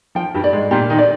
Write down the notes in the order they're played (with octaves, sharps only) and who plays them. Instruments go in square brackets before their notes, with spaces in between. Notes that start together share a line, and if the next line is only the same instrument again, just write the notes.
[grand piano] F3 [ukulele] G5
[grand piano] G2 G3
[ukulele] D5
[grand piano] G#2 G#3
[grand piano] A#2 A#3 [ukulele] G4
[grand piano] D#3 D#4
[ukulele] D5